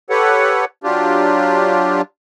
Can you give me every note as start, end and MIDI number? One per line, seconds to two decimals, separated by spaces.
0.10 0.65 67
0.10 0.65 69
0.10 0.65 71
0.10 0.65 73
0.10 0.65 78
0.84 2.02 54
0.84 2.02 62
0.84 2.02 65
0.84 2.02 67